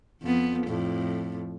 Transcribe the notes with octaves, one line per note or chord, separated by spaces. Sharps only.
F2 B3
F2 A2